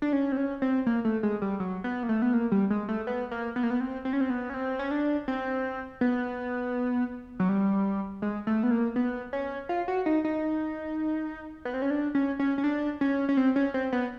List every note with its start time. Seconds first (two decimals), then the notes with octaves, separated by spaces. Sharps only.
0.02 D4
0.13 C#4
0.32 C4
0.37 C#4
0.62 C4
0.86 A#3
1.05 A3
1.23 G#3
1.42 G3
1.60 F#3
1.84 B3
2.03 A#3
2.09 A3
2.22 B3
2.34 A#3
2.52 G3
2.70 G#3
2.88 A3
3.07 B3
3.31 A#3
3.56 B3
3.63 A#3
3.70 B3
3.80 C4
4.05 C4
4.13 C#4
4.21 C4
4.30 B3
4.50 C#4
4.54 C4
4.79 C#4
4.91 D4
5.28 C4
6.01 B3
7.40 F#3
7.49 G3
8.22 G#3
8.47 A3
8.63 B3
8.71 A#3
8.96 B3
9.33 C#4
9.69 F4
9.88 F#4
10.06 D#4
10.24 D#4
11.65 B3
11.74 C4
11.82 C#4
11.90 D4
12.15 C#4
12.39 C#4
12.58 C#4
12.64 D4
13.01 C#4
13.29 C#4
13.37 C4
13.56 C#4
13.74 C4
13.92 B3